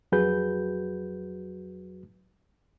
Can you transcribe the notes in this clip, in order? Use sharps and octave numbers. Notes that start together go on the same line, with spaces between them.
F2 F#3 F#4 G#4 B4 G6